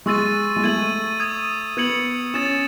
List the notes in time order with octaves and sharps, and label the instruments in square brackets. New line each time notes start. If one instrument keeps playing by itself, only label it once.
[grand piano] G#3 [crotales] C#6 E6 A6 D#7
[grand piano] G#3
[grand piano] A3 [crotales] G#6 D#7 F#7
[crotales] D#6 G#6 D#7
[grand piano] B3 [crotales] G#6 C#7 F#7
[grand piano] C#4 [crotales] D#6 A6 E7